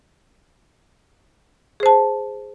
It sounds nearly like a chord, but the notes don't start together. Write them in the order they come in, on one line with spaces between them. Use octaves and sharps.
G#4 C5 A5